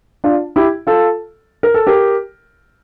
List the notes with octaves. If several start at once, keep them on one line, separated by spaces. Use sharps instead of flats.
D4 F4
E4 G4
F4 A4
A#4
A4
G4 A#4